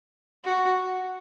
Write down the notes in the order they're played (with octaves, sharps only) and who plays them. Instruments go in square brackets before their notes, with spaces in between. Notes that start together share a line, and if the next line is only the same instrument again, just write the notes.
[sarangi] F#4